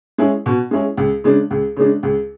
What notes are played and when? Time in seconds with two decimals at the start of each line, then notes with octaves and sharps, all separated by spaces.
0.18 G#3 C#4 E4 G#4
0.46 B2
0.71 G#3 C#4 E4 G#4
0.97 C#2
1.24 C#3 G#3 D4
1.51 C#2
1.76 C#3 G#3 D4
2.03 C#2